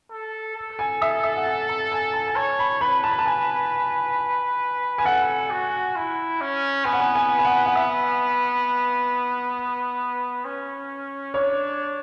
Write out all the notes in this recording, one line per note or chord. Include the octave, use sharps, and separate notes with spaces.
A4
A4
G#5
E5
E5
F#5
G#5
A5
G#5
A5
G#5
C#5 A5
B5
B4 B5
A5
B5
A5
G#5
G#5
A4 F#5
F#4
E4
C#4
B3 G#5
F#5
G#5
G#5
G#5
F#5
F#5
E5
C#4
D4 C#5